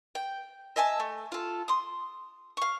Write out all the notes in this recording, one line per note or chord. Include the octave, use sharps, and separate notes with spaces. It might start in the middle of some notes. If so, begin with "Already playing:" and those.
G5
D#5 E5 G#5 A5
A3
F4 A4
C6 D#6
F5 C#6